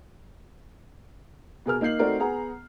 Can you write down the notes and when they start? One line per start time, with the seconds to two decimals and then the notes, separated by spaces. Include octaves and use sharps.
1.66 B2 G#4 A#4 F6
1.81 A#3 D#4 G6 C7 F#7
1.99 A3 C4 D#4 F#4 A#4 D5
2.19 B3 G#4 F#5 A#5